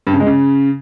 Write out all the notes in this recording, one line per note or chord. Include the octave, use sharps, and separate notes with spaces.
G2
C#3
G#3
C#3